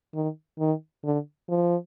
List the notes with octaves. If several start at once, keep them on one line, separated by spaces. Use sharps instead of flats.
D#3
D#3
D3
F3